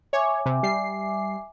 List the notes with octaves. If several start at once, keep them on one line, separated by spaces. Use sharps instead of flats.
C#5 E5 G#5 D6
C3
G3 C7